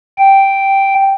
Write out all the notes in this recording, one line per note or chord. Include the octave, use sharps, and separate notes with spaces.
G5